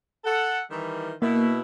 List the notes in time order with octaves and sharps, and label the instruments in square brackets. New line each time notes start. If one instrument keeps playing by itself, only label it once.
[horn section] A4 F#5
D#3 E3 G3
[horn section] B2 E4 [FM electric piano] A#3